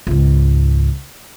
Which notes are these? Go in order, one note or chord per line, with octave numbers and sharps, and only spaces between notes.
C#2 G#2